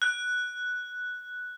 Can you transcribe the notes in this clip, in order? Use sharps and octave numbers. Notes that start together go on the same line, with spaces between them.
F#6